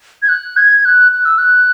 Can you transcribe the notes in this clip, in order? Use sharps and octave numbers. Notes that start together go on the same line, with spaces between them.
G#6
F#6
G#6
F#6
F#6
E6
F#6